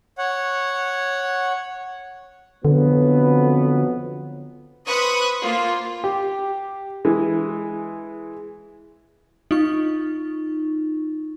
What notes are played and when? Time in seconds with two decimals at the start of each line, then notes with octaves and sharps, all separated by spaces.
0.18 C#5 F#5
2.65 F2 D3 F#3 B3
4.86 B4 C5 B5 C#6 D#6 F#6
5.41 A#3 F4
6.04 G4
7.05 E3 G#3
9.51 D#4 F4 C#6